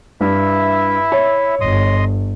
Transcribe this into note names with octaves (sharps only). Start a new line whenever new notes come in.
G2 E4 E5
C#5
G1 D#5 C6 D#6